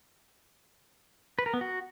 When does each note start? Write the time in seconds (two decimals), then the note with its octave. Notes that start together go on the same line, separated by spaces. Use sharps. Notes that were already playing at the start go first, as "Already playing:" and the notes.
1.39 B4
1.46 A#4
1.54 B3
1.61 F#4